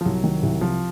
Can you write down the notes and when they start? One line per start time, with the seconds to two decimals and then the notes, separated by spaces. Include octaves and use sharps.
0.01 F3
0.05 C2 F#3
0.24 D#3
0.43 C2
0.61 C3 F3